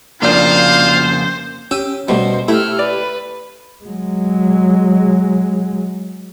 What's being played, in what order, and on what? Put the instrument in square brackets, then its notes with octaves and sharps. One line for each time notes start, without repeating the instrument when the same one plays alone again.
[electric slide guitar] F2 C#3 A#3 [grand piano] D4 A#4 [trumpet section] F4 F5 [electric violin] C5
[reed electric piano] C#4 [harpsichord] G4 [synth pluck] E6 D#7
[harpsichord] B2 [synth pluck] G3 A3 [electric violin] C5
[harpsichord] A3 [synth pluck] E4 [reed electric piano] G4 [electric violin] E6 F6
[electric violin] B4 [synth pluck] D5
[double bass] F#3 G#3